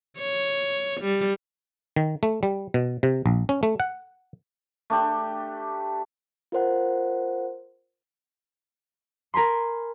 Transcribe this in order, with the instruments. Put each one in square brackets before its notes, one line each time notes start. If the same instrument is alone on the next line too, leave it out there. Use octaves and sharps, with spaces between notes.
[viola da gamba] C#5
G3
[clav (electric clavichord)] D#3
A3
G3
B2
C3
A#1
C#4
A3
F#5
[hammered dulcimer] A3 D4 G4
[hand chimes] F4 A#4 C5 F#5
[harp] A#4 G#5 B5 C6